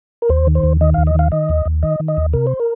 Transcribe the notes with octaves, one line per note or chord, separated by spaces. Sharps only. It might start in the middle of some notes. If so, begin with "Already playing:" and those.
A#4
D#2 C5
D#3
C5
D#2
D#3 D#5
D#2 F5
D#5
D#3 F5
D#3 D#5
D#2
D#2
D#3 D#5
D#3
D#5
D#2
C3 A#4
C5
A#4